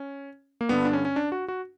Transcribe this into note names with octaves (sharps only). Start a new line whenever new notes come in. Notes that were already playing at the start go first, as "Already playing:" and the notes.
Already playing: C#4
A#3
G2 D3 B3
D4
C#4
C#4
D4
F#4
F#4